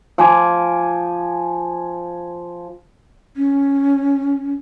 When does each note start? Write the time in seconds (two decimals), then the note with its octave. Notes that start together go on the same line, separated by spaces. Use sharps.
0.18 F3 G#5 D6
3.37 C#4